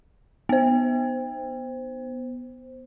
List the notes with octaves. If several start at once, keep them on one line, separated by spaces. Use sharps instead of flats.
B3 C5